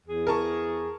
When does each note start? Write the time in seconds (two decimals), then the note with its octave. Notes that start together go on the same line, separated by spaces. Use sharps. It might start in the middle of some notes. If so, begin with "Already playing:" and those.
0.07 E2 G#4
0.27 A#4 A5 C#6